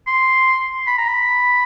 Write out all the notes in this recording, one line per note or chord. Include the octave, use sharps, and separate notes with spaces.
C6
B5
A#5
B5